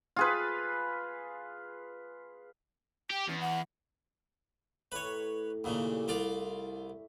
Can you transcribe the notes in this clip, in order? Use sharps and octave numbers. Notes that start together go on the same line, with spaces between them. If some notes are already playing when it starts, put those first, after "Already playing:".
F4 G#4 B4
G4 G5
E2 C#4
F#5
A2 G4 B4 C#5 A#5
D#2 A#2 C#3 A3 D4 E4
C2 F4 D5